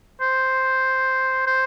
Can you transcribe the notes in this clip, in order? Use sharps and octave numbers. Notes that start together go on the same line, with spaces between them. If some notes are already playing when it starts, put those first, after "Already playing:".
C5
C5